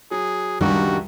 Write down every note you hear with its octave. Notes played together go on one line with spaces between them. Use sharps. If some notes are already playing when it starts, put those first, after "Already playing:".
F#3 G#4
C#2 F#2 D#3 G3 D4 F#4 G4